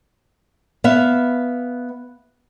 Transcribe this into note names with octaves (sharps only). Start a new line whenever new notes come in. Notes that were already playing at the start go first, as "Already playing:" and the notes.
B3 E5 F5